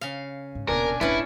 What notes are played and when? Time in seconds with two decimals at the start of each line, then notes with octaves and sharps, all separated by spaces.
0.01 C#3 F5
0.55 G#2
0.68 D#1 B2 D4 A#4 G#5
1.01 D#1 G#1 C#4 D4 E4 B4